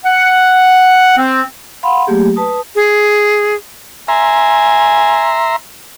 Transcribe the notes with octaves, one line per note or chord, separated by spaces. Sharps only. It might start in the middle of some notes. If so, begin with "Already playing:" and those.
F#5
C4
F5 F#5 B5 C6
F#3 A3 A#3 G4 G#4
B4 A5 D#6
G#4
E5 G#5 A#5 C6